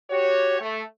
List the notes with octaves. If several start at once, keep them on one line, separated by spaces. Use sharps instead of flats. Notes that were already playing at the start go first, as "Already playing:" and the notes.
F#4 G4 C#5
A3